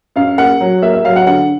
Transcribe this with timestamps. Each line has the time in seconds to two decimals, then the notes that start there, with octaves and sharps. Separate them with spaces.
0.16 F#2 F5
0.38 A#3 F#5
0.60 F#3
0.82 A#3 E5
0.93 E5
1.05 F#3 F5
1.16 F#5
1.27 D3 F#5